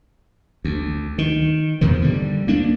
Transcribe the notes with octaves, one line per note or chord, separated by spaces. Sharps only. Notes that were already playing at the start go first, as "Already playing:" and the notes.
D2
D#3
E2 B2 D#3 F3
D3 G3
D2 A#3 D4